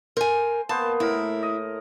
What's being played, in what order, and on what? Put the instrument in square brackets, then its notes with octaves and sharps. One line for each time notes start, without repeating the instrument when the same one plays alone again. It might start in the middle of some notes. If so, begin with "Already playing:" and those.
[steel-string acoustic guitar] A#4 G#5 [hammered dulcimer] C5
[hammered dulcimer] A#3 B3 C5 [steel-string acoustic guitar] A5
[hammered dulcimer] A2 A#4 [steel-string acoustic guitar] E4
[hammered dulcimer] D#5